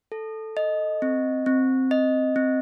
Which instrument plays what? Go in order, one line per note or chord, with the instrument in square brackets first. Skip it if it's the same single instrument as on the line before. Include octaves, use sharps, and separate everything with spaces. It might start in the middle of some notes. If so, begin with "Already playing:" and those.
[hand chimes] A4
D#5
C4
C4
D#5
C4